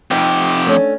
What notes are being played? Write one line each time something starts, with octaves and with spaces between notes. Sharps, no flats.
F2 C4 D#4 G4
A3 C#4 D4